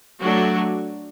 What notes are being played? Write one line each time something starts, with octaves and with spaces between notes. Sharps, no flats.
F#3 A3 D4 F#4